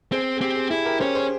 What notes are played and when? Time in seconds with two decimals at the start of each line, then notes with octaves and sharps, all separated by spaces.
0.12 C4 G#4 C5
0.36 G#4
0.41 C4 G4
0.56 G#4
0.71 E4 G#4
0.85 G4 A#4
1.00 C#4 G#4 C5
1.15 G#4 C5